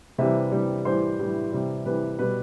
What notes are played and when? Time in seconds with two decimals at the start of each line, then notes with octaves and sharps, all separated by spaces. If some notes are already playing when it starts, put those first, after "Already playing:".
0.18 C3 E3 G3 E5
0.51 C3 E3 G3
0.85 A2 E3 G3 C5
1.19 A2 E3 G3
1.52 C3 E3 G3
1.86 C3 E3 G3 B4
2.19 B2 G3 B4